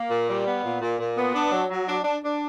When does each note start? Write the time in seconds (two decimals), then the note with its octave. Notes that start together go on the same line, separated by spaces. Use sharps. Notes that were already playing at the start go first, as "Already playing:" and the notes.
Already playing: A#3
0.10 A#2
0.29 G3
0.47 B3
0.64 A#2
0.81 A#2
0.99 A#2
1.17 B3
1.34 D4
1.52 F#3
1.70 F#3
1.87 D4
2.05 D4
2.22 D4